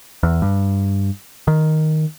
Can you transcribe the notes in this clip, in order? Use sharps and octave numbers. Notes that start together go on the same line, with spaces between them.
E2
G2
D#3